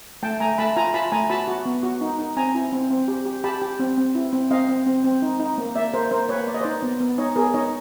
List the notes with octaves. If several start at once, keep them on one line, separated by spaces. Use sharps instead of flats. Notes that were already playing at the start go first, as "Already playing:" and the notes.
A3 G5 A5
A3 G#5 A#5
A3 A5 B5
F4 G#5 A#5
F4 A5 B5
A3 G#5 A#5
F#4 A5 B5
F#4
B3
F#4
D#4
D#4
C4 G#5 A#5
E4
C4
C4
G4
G4
G4 A5 B5
G4
C4
C4
E4
C4
C4 D#5 F5
C4
C4
C4
D#4
D#4
A#3
A#3 D5 E5
A#3 A#4 C5
A#3 A#4 C5
A#3 B4 C#5
A#3 D5
D#5
D#4 C5 D5
B3
B3
D#4 C#5 D#5
B3 G#4 A#4
D#4 C#5 D#5